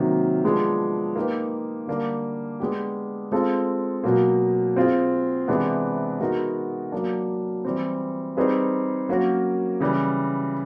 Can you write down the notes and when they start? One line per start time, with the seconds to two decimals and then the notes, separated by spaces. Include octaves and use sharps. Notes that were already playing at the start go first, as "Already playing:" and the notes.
Already playing: C3 D#3 F#3 A#3
0.44 F3 G#3 B3 D4
1.15 A#3 D#4 G4 B4
1.87 D3 G3 A#3 D4
2.60 G#3 B3 D4 G4
3.32 G#3 C4 F4 A4
4.04 B2 F#3 A#3
4.76 C4 F4 G#4
5.48 C3 E3 G#3 B3 D4
6.20 G#3 B3 D#4 F#4 A#4
6.92 F#3 A#3 D4
7.64 E3 G3 C4
8.37 G3 C4 D#4 G#4 B4
9.09 F#3 A#3 C#4 F#4 A#4
9.80 C#3 E3 G3